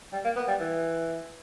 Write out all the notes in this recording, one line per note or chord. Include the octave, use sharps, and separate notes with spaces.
G3
A#3
B3
G3
E3